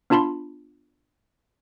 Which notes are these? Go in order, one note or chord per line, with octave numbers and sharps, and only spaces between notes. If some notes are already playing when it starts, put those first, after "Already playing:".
B3 D4 F4 A5 B5 C6